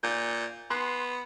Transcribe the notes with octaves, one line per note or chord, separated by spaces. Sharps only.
A#2 G6
B3 C6 F#6 C7